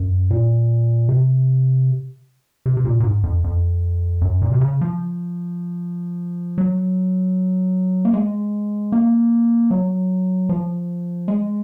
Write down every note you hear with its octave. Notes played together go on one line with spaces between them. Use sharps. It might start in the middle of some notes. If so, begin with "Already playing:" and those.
Already playing: F#2
A#2
C3
C3
C3
A#2
A#2
G#2
F2
F2
F#2
A#2
C3
C#3
F3
F#3
A#3
G#3
A#3
F#3
F3
G#3